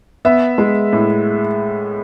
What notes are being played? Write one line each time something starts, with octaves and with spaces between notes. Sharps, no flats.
B3 E5
G#3
A2